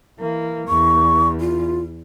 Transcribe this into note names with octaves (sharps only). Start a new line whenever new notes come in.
E3 A#3
E2 C#6
F4